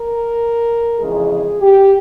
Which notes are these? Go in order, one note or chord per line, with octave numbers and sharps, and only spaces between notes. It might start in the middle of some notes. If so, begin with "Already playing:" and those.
Already playing: A#4
F2 C#3 E3 G#3 G#4
G4